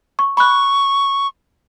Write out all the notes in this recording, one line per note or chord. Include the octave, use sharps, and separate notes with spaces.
C#6
B5 C#6 F#6